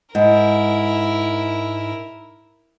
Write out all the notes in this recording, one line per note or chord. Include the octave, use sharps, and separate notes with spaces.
G#2 E4 A#4